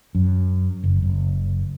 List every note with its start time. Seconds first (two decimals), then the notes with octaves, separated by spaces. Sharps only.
0.15 F#2
0.84 F#1
1.02 F#1